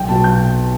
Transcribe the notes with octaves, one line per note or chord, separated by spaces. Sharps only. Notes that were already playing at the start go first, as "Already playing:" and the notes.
Already playing: B1 G5
B2 F#3 A5
G6